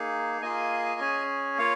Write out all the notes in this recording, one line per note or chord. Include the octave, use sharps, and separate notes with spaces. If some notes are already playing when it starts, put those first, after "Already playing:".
Already playing: A#3 D#4 G#4
A#3 F4 G#4 D#5 G#5
C#4 G#4
A#3 F4 C#5 F5